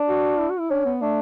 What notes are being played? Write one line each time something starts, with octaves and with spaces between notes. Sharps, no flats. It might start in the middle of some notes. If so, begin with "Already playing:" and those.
Already playing: D4
F#4
E4
F#4
E4
C#4 D4
B3
A3 D4